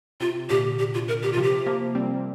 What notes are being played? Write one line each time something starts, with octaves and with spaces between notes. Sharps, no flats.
C3 F4
A#2 D3 G4
G4
F4
A#4
G4
C3 F3 F4
G4
F3 A#3
G3 C4